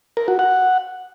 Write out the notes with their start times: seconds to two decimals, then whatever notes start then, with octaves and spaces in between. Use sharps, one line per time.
0.17 A#4
0.28 F#4
0.39 F#5